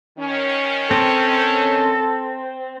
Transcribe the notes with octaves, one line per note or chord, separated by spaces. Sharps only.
D#3 C#4
C4 A4